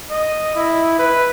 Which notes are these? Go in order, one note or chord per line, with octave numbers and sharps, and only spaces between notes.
D#5
E4
B4